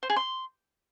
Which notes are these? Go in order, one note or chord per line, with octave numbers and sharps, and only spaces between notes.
C5
G#4
C6